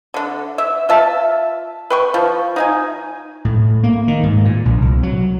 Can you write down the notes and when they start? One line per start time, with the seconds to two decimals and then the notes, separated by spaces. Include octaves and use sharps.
0.14 D3 D4
0.58 E5
0.89 F4 E5 A5
1.90 B4 G5 C#6
2.14 F3
2.56 D#4 F5 G#5
3.45 A2
3.83 A#3
4.08 D#3
4.23 G#2
4.45 A#2
4.65 A#1
4.82 C2
5.03 F#3